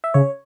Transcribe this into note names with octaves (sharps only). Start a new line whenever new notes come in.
E5
C#3 C#5